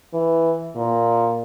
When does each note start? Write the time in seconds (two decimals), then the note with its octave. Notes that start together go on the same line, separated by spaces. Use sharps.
0.14 E3
0.76 A#2